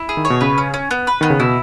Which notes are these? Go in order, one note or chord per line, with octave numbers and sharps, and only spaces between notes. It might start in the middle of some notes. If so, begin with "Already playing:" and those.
Already playing: E4
G#4
D#3
C#5
B2
C#3 B4
C#4
C#4
B3
B4
D#3 B3
C#3
B2 E4